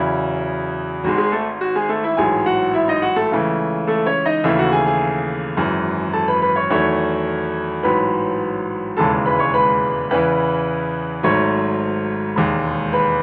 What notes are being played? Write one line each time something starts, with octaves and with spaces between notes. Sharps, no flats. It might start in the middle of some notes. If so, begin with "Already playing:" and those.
Already playing: E2 C#3 F#3 E4
G#1 G#2 D#3 G#3 F#4
G#3 G#4
A3 A4
F#4
G#3 G#4
A3 A4
E4 E5
A1 G#2 F#3 G#4 G#5
F#4 F#5
E4 E5
D#4 D#5
F#4 F#5
A3 A4
C#2 C#3 E3 A3
A3 A4
C#4 C#5
D#4 D#5
D#2 C#3 E3 A3 E4 E5
F#4 F#5
G#4 G#5
G#4 G#5
G#1 F#2 E3
A4 A5
B4 B5
B4 B5
C#5 C#6
E2 D#3 F#3 A3 C#5 C#6
A1 G#2 F#3 B4 B5
E1 D#2 C#3 E3 G#3 A4 A5
B4 B5
C#5 C#6
B4 B5
E2 C#3 E3 B4 B5
G#1 G#2 F#3 A3 C#5 C#6
E1 D#2 D#3 G#3
B4 B5